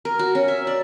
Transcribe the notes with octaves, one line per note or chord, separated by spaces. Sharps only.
A#4
F#4
C#4
E5
D5